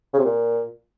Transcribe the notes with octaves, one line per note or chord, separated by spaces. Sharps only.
C#3
C3
A#2